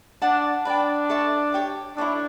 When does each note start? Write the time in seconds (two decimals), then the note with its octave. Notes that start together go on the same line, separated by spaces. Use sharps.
0.22 D4 D5 F#5 A5
0.65 D4 B4 D5 G5
1.10 A4 E5 A5 C#6
1.52 G4 C#5 G5 D6
1.96 D4 E4 A4 C#5 E5